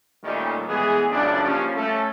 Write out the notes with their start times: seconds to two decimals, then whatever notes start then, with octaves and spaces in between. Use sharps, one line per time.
0.24 A#2 D#3 G3 A3 C#4 D#4
0.67 A2 E3 G#3 B3 G#4
1.11 C#2 F#2 A2 C#3 D4
1.44 F3 G3 A#3 C#4
1.76 A3 C#4 A4